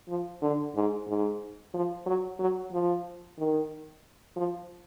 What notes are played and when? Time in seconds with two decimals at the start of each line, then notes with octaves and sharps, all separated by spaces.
0.09 F3
0.42 D3
0.76 G#2
1.08 G#2
1.74 F3
2.06 F#3
2.39 F#3
2.72 F3
3.38 D#3
4.37 F3